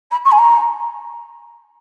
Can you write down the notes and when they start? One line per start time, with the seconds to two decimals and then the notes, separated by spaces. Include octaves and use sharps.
0.11 B5
0.25 C#6
0.31 G#5
0.38 A#5